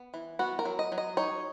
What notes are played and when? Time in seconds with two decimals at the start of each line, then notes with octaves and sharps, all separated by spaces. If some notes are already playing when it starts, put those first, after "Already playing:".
Already playing: B3
0.14 E3
0.39 B3 F#4
0.59 A#4
0.65 F#3
0.79 D#5
0.92 F#3
0.98 D#5
1.17 D#4 C#5